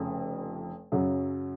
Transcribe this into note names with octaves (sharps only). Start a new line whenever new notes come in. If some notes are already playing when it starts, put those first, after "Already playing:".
Already playing: F1 F2 C#3
F#2 C#3 F#3 C#4 F#4